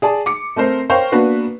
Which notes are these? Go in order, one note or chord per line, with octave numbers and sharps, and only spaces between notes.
G#4 D5 A5
D6 C#7
A3 C4 A#4 C5
A#4 C5 C#5 F5 G5 C#6
A#3 B3 D4 F#4 B4